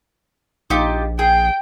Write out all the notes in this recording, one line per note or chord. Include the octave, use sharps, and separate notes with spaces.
A#1 D#4 F4 G4
G#4 G5